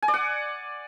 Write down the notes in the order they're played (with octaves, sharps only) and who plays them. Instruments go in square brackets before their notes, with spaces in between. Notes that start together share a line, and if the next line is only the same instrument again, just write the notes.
[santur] G#5
D5
F#5